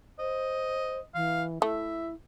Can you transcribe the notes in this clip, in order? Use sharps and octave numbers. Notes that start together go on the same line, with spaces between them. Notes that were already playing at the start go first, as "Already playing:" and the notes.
C5 D#5
E3 F5
A3 E4 E5